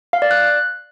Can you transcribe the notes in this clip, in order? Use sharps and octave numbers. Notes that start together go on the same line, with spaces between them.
F5
D5
F#6